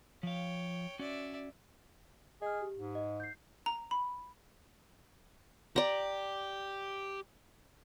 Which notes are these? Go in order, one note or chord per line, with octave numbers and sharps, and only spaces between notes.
F3 C#5 F5 G5
C#4 F#4 D5 E5
G#4 D#5 F6
G4
G#2
D#5
G6 C7
A#5
B5
G4 D5 A#5